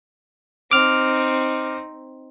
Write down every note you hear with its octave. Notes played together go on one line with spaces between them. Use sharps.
C4 D#4 D6 F6